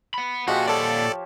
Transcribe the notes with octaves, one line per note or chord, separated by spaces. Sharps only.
F#5 B5
A#2 F3 G#3 F#4 G4 F#5
A4 C#5 D5 A5